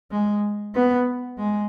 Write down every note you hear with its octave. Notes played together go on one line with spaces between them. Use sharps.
G#3
B3
G#3